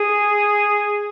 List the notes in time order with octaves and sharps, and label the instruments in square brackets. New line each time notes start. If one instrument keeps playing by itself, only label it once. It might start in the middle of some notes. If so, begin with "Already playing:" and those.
Already playing: [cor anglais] G#4